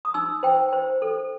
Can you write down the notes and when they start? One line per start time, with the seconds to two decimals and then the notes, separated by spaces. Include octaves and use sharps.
0.05 D#6
0.14 D#4 E6
0.43 C5 G5
0.73 C5
1.02 A4